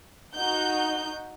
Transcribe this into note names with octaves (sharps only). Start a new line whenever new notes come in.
D#4 F#4 G6